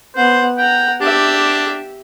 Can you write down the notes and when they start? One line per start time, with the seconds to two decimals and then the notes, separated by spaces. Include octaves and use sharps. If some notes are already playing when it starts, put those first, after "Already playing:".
0.16 B3 C5 F#5
0.58 F#5 G5 A#5
1.01 D4 G4 E5